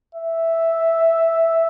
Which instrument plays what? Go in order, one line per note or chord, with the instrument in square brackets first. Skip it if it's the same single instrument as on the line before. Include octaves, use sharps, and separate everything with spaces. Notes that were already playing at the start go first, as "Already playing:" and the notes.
[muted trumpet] E5